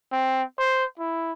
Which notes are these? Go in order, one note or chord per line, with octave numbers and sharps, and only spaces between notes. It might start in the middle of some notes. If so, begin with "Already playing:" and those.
C4
C5
E4